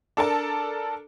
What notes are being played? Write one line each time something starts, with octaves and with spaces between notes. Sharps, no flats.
D4 A4 A#4 A5